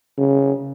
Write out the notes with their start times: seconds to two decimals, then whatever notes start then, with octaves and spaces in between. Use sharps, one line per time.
0.18 C#3